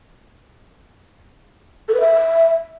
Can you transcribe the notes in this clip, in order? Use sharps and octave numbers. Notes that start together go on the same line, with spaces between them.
A4
B4
E5